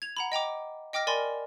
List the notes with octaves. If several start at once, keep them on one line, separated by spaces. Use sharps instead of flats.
G#6 F7
F#5 A#5 B5
D#5 G5 A#5 D6
D#5 G5 D6 F6 A#6
A#4 D5 G#5 B5 C6